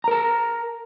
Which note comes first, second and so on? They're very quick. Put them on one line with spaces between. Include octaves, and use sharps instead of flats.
A#5 A#4 A5